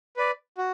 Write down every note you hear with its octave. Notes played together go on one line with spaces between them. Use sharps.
B4 D5
F#4